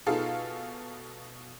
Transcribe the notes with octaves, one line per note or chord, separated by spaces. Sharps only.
B2 D#4 F4 G#4 A4 F5